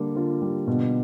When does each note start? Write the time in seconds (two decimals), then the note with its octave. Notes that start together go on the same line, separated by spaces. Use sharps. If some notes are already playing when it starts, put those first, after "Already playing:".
Already playing: D3 G3 A#3
0.16 D3 F4
0.42 G3
0.67 B2